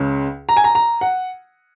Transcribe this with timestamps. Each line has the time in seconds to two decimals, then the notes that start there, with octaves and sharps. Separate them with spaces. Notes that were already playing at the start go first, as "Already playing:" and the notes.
Already playing: C#2 C#3
0.49 A#5
0.57 G#5
0.64 A#5
0.75 A#5
1.01 F#5